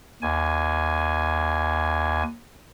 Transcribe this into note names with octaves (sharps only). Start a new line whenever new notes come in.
D#2 G#5